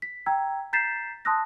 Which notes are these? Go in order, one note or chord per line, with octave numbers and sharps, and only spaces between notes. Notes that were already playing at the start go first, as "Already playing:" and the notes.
B6
G5 A#5 E6 G#6
A#5 G6 A6 B6 C7 E7
A5 C6 D#6 E6 F#6 A#6